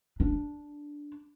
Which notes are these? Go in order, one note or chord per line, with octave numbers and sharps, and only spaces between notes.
D4